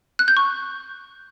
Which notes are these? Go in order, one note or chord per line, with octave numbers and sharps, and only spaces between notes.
F#6
G6
C#6